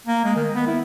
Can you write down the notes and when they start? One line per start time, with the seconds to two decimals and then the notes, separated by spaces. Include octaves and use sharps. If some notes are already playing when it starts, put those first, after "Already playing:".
0.07 A#3
0.24 G#3
0.36 D#3
0.55 B3
0.67 E4